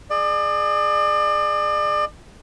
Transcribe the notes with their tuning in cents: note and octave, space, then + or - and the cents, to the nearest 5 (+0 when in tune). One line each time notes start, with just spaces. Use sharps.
G#4 +5 D5 +35